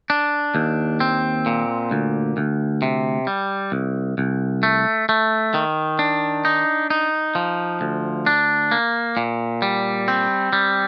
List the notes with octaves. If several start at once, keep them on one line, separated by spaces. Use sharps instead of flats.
D4
D#2
C4
A#2
D2
D2
C3
G3
C2
C2
A3
A3
D#3
D4
D#4
D#4
F3
D2
D4
A#3
A#2
G3
C4
G3